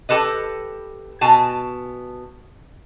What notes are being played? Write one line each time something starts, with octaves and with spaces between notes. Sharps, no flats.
G4 A4 B4 D#5
B2 G#5 A5